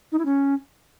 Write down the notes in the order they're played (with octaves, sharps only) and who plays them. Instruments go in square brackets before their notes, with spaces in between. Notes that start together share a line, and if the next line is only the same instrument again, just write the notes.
[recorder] D#4
E4
C#4